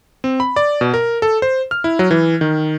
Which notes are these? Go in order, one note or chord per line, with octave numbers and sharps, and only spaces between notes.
C4
B5
D5
B2
A#4
A4
C5
F6
E4
F#3
E3
D#3